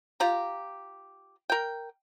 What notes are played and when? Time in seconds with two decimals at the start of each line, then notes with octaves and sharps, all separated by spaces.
0.20 F4 G4 A#5
1.50 A#4 G5